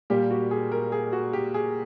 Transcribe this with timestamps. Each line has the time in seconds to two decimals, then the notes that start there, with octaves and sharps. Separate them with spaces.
0.10 A#2 G3 A#3 G4
0.31 F#4
0.51 G#4
0.72 A#4
0.92 G#4
1.13 F#4
1.33 G4
1.54 G#4